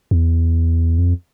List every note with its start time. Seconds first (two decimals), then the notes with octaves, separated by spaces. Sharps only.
0.11 E2
0.98 F2